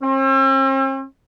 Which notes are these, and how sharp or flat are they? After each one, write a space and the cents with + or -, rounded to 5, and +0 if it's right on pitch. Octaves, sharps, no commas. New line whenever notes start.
C4 +45